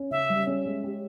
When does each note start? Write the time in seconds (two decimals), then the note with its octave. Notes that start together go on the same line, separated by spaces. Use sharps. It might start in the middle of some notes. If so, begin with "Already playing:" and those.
Already playing: C#4
0.11 C#3 E5
0.30 G3
0.47 C#4
0.66 G#3
0.84 G4